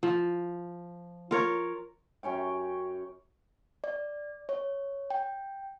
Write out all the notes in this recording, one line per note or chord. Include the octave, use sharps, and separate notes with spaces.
F3
F4 A#4 C#5
F#2 C#4 C#5 G5
D5
C#5
G5